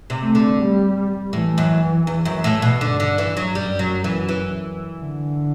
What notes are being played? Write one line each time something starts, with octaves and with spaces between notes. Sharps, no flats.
C3
A3
D3
G3
A2 E3
F#2
E2
F#2
A2
B2
G2 D3
D3
E3
F#3
F#2 G3
F#3
E3
E3
D3